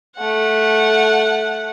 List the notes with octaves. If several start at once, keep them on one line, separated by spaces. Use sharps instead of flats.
A3 F#5